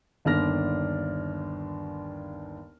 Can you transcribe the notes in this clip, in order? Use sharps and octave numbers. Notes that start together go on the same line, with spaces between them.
G1 D#2 D4 D5 F6 A#6